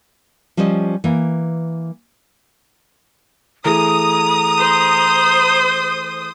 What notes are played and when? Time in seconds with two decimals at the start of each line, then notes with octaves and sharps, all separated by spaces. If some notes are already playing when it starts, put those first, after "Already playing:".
0.57 F3 G3 C#4 C5 D#5
1.04 E3 A#3
3.65 E3 A3 G#4 A#5 D#6
4.58 C5